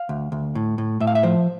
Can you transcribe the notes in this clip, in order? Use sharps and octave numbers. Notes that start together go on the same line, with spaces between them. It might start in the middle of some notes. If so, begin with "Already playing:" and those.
Already playing: F5
D2
D2
A2
A2
A2 E5
F5
E5
F3 C5